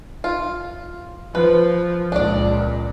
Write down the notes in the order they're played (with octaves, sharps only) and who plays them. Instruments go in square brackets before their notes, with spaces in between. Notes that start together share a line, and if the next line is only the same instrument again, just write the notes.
[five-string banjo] F4
[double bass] F3 [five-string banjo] B4
[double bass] C#2 A#2 [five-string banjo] D4 D5